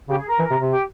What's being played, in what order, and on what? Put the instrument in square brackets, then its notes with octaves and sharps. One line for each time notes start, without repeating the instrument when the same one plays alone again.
[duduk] C#3 [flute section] G4
[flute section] G#4
A#4
[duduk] E3
C3
C3
[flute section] G4